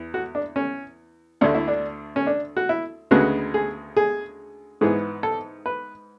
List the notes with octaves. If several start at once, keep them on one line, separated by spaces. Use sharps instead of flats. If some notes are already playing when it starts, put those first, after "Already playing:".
Already playing: E2
F#4
D4
C#4
D2 D3 A3 D4
E4
D4
C#4
D4
F#4
E4
D2 C#3 G#3 B3 F#4
G#4
G#4
G#2 E3 B3 G#4
A4
B4